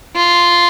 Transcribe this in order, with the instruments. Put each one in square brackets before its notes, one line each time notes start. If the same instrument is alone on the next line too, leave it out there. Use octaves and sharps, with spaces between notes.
[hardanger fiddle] F4